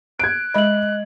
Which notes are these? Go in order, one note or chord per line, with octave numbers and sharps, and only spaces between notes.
F#6 G#6 D7
G#3 D#5 E5 B5 F#7